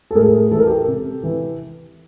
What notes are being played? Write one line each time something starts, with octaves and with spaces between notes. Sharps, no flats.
A4
A2 G#4 A#4
E3 A4
A#4
G4 A4
C3
E3